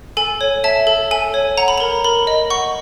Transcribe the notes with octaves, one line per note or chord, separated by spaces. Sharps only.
A4 G#5
C#5
E5 A5
A4
A4 G#5
C#5
F#5 A#5
B5
A#4 A#5
A#4 B5
D#5
F#5 C#6